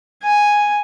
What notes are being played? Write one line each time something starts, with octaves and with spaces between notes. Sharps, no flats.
G#5